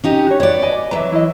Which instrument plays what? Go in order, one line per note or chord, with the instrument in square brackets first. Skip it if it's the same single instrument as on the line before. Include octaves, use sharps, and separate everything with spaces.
[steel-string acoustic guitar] C#4 D#4 G4
[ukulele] F#4 C#5
[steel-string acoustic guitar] B3 D5 [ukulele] F#4 C#5
[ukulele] D#5 G#5
[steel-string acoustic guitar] E3 F#3 [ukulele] E5 A#5
[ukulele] E4 D#5